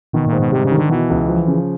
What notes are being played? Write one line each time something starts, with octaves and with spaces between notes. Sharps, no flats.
B2 D#3
A#2
G#2
B2
C3 G3
C#3
D#3
D3
B2 E3
C#2
F3
C#3